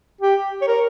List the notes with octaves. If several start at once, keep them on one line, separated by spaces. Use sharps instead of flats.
G4
C#5
A#4